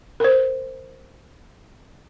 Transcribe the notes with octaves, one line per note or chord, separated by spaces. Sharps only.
A#4 C5